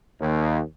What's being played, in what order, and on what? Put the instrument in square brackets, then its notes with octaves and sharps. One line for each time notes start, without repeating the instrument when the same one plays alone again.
[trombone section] D#2